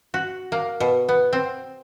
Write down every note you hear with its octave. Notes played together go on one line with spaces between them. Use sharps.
F#4
A#3
B2
B3
C4